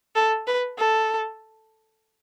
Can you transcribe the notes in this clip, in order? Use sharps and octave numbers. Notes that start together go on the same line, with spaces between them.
A4
B4
A4